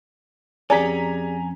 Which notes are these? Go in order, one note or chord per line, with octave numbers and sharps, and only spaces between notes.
F2 C#4 G4 G#4 D5 G#5 A#5 B6